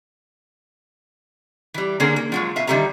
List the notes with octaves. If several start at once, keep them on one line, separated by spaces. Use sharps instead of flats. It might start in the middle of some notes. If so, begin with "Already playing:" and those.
E3 G3
D3 A#3 C#4 D4 G#4 A#4
A#3
F3 F#3 G#3
B2 E5 F5
D3 D#3 G3 A4 E5 A#5